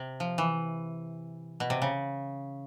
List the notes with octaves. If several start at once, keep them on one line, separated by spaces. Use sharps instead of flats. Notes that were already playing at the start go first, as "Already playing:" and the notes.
Already playing: C3
F3
E3
B2
C3
C#3